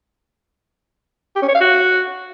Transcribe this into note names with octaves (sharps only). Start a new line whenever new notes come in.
G4
C#4
C#5
F5
F#4